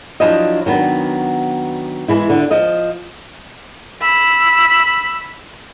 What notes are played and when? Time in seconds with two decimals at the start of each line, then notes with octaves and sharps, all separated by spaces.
0.20 F3 F#3 D4 E4 C#5 D#5
0.66 D#3 F#3 B3 D4
2.08 E3 G#3 E4
2.30 D3
2.51 F3 D#5
4.01 B5 E6